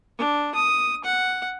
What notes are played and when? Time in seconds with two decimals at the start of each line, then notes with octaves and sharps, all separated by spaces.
0.18 D4
0.55 D#6
1.04 F#5